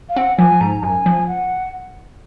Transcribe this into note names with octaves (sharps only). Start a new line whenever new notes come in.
F5
C4 F#5
F3 G#5
G#2 A#5
F#2 G#5
F3
F#5